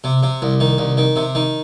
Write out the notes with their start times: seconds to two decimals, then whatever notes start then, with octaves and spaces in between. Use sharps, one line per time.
0.04 C3
0.23 C3
0.42 C2
0.60 D#3
0.78 C2
0.97 D#3
1.16 C3
1.35 D#3